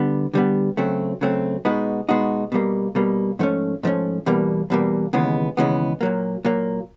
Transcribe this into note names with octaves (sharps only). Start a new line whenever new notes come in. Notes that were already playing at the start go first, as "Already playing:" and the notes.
Already playing: D3 G3 B3
D3 G3 B3
C#3 F#3 A3 C4
C#3 F#3 A3 C4
B2 G#3 B3 D#4 F#4
B2 G#3 B3 D#4 F#4
B2 G3 A#3
B2 G3 A#3
G#2 F3 A3 C#4
G#2 F3 A3 C#4
E2 B2 G3 A#3
E2 B2 G3 A#3
D#2 C#3 E3 G#3 B3
D#2 C#3 E3 G#3 B3
A#2 F#3 A#3
A#2 F#3 A#3